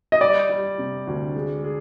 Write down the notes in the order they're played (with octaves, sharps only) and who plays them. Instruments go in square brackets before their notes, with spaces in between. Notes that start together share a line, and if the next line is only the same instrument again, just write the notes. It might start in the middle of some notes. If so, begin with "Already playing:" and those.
[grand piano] D#5
[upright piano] G3 [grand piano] D5
[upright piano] G3
C3
D2
G#3
G#4